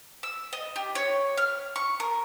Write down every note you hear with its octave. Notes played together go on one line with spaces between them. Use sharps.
E6
D#5
G4
C#5
F6
C#6
A#4